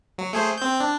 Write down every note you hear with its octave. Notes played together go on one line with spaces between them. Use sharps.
F#3
A3 G#4 C5
C4 G6
D4